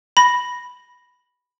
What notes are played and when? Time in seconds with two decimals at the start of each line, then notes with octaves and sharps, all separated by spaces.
0.17 B5 A#6